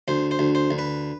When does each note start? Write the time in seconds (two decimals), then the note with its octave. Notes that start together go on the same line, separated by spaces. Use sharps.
0.08 D2 C5
0.31 C5
0.39 D2
0.55 C5
0.71 D2
0.79 B4